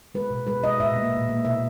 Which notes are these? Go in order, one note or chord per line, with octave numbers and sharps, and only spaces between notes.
G#3 B4
B2
G#3 B4
G#3 D#5
A#2 E5
A#3
A#2
A#3
B2 E5